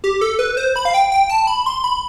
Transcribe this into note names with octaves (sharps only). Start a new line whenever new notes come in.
G4
A4
B4
C5
B5
F5
G5
G5
A5
B5
C6
B5